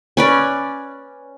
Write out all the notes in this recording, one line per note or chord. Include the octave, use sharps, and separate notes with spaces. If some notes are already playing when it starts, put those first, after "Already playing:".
C#4 B4 D5